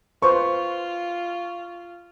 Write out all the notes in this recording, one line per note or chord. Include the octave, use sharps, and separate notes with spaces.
F4 B4 C5 C#6